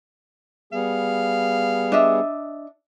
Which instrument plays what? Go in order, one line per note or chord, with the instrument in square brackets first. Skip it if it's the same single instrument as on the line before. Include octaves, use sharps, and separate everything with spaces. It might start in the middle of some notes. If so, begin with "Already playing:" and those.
[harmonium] G3 B3 G#4 [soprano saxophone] F5
[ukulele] D4 D#5 E5